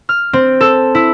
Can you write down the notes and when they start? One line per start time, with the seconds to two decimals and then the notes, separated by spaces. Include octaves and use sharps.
0.09 F6
0.33 C4
0.61 A4
0.95 E4